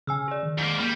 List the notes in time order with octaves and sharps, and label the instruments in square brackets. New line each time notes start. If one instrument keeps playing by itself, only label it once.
[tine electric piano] C#3 [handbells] G#5 E6 F6
[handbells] G#4 D5
[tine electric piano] D#3
[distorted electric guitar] G#2 A#3
[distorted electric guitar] G3 [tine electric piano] A#3